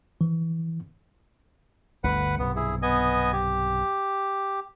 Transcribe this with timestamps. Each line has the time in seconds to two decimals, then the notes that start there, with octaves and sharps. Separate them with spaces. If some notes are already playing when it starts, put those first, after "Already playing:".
0.21 E3
2.04 G1 D2 D3 B4 F#5
2.39 B1 G2 C3 B3
2.56 E4 G#4
2.82 B3 D#5 G#5
3.33 G4